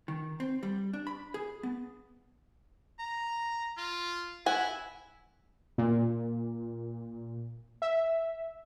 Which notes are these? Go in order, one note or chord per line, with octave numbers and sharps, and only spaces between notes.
D#3
C4
G3
D4
B5
G#4
B3
A#5
F4
E4 F#5 G#5
A#2
E5